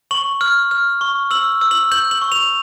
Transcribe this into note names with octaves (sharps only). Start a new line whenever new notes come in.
C#6 F#7
F6
F6
C#6
E6 F#7
E6
F#7
G6 F#7
F#7
C#6
F7